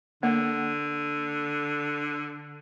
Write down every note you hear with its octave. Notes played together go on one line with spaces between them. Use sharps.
D3 A#3